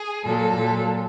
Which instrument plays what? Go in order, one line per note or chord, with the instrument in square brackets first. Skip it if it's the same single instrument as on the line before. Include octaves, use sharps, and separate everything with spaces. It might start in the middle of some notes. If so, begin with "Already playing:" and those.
Already playing: [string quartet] G#4
A#2 F#3 A4
A#2 F#3